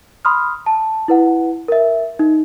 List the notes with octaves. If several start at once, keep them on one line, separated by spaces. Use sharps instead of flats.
B5 C6 D#6 F6
A5
E4 B4 F#5
A#4 E5
D#4